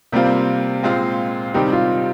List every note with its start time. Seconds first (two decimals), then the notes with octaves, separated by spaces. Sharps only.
0.12 C3 G3 A#3 C4 F4
0.83 A#2 G#3 C4 F4
1.54 C3 D#3 G3 C4 D#4 G4
1.72 F4